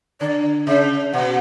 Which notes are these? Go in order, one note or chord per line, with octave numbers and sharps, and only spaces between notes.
D3 D5
C#3 E5
B2 F#5